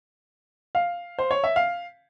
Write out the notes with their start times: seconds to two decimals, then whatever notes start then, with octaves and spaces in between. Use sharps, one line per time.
0.75 F5
1.19 C5
1.31 C#5
1.44 E5
1.56 F5